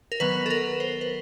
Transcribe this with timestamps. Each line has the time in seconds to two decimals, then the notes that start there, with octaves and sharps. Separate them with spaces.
0.12 A#4
0.20 D#3 F#3 B3 B4
0.46 A4
0.50 A#4
0.80 C5
1.01 B4